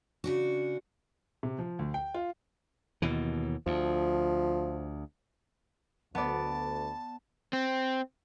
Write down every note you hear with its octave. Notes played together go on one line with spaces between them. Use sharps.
C#3 D4 F#4
C3
F3
D2
G5
F4
D#2 B2 E3
D2 F3
D2 B3 D5 A5
C4